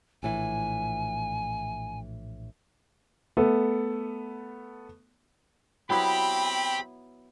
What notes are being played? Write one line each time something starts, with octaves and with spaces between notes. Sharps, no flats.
A#1 A2 E3 G#5
A3 B3 A4
F#3 B3 C4 E4 G4 G5 B5